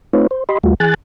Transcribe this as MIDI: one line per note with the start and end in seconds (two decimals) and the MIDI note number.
0.13 0.27 57
0.13 0.27 60
0.13 0.27 63
0.13 0.27 65
0.13 0.27 71
0.13 0.27 73
0.31 0.44 72
0.49 0.58 67
0.49 0.58 75
0.49 0.58 83
0.49 0.58 84
0.64 0.75 39
0.64 0.75 55
0.64 0.75 57
0.64 0.75 65
0.64 0.75 66
0.80 0.94 52
0.80 0.94 68
0.80 0.94 80
0.80 0.94 90
0.80 0.94 93